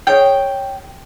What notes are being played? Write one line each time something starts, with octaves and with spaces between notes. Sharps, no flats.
G#4 C#5 D#5 G5